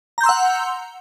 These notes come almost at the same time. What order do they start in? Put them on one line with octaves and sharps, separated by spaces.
A#5 G6 C6 E6 F#5